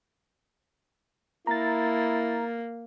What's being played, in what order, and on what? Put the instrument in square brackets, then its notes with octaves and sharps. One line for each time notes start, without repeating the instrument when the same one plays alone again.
[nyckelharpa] A#3 [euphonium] E4 [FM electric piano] A#5 A6